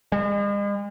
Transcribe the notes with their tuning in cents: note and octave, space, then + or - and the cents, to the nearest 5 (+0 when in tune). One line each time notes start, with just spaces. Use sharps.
G#3 -40